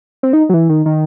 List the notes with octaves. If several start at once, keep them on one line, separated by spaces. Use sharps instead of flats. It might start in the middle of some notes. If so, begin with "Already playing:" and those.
C4
D#4
F#3
E3
D#3
D#3